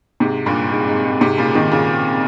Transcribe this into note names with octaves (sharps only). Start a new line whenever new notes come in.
G#2 C3
G2 A#2
G#2
G#2
G#2
G#2 C3
A#2 C#3
C3 D#3
A#2 C#3